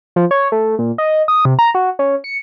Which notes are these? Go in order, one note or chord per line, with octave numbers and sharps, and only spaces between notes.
F3
C#5
A3
A#2
D#5
D#6
C3
A#5
F#4
C#4
C#7